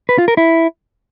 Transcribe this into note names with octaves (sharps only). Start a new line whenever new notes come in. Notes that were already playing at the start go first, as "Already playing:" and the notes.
B4
F4
A#4
E4